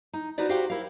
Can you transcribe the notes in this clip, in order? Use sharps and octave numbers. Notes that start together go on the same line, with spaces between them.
D#4
D#4 F4 F#4 B4 C5 D5
F#4 G4 C5 F5 G5
E4 A#4 C5 F5